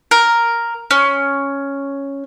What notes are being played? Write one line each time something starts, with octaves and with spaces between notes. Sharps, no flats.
A#4
C#4